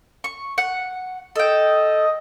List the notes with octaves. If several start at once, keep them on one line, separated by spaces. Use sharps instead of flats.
C#6
F#5
A4 D#5 G5